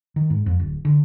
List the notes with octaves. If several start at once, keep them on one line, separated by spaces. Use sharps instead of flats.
D#3
G#2
F2
D1
D3